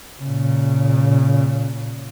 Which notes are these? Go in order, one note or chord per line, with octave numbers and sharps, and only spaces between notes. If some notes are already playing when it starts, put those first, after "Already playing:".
A#2 C#3